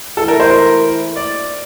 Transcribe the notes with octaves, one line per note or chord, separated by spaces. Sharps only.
E3 A3 E4 A4
A#4
C5
A#4
D5